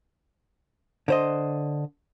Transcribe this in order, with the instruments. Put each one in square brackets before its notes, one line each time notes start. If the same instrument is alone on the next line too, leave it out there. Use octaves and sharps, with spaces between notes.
[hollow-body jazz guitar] D3 C5 D#5